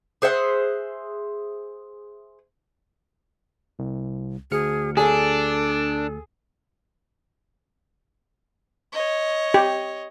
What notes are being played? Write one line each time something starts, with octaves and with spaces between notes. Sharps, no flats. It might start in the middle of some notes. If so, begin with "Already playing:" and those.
G#4 C5 E5 F#5
C2
D2 G#4 F6 C#7
D4 G#4 A4 G#5
C#5 D#5
G4